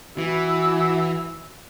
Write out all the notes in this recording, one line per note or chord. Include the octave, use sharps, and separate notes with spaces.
E3 E4 F#4 E6